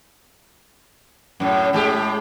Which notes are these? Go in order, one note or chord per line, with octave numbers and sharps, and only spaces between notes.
F#2 A2
A2 G#3 G4